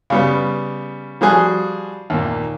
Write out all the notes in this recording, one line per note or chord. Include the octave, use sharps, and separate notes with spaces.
C#3 G3 B3
F3 G3 F#4 G#4 F#6
D#2 A#2